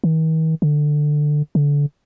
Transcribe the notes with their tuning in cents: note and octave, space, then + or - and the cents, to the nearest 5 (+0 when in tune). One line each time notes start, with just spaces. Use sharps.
D#3 +45
D3 +15
D3 -25